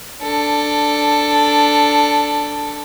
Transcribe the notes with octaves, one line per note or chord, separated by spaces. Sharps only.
D4 A4